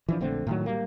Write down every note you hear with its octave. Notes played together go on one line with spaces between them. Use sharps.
E3 F3 D4
A#1 D3 A3 C4
A2 D#3 F#3
G3 A#3